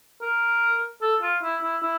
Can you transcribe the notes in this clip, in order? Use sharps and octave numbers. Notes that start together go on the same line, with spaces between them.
A#4
A4
F4
E4
E4
E4